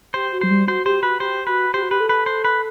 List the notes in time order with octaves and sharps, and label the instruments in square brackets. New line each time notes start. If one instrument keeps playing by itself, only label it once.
[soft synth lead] G4 [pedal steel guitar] C5
[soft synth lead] F#4
[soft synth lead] F#3 [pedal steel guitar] C5
[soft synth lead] G3
[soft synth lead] F#4 [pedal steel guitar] C5
[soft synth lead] G4 [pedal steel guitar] C5
[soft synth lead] F#4 [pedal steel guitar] B4
[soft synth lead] G4 [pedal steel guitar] C5
[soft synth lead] F#4 [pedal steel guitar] B4
[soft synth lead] G4 [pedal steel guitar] C5
[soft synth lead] F#4
[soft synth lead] G4 [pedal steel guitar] B4
[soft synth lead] A4
[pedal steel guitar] B4
C5
B4